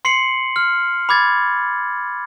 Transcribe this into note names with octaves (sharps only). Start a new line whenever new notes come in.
C6 C7 C#7 F#7
F6
B5 D6 G#6 A6